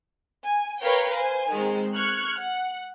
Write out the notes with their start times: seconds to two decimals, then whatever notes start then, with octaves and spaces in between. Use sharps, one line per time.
0.44 G#5
0.80 A#4 B4 C#5 F5 G5
1.15 C5 G#5
1.52 D#3 G#3 C4
1.93 C#6 F6 F#6 G#6 C#7
2.39 F#5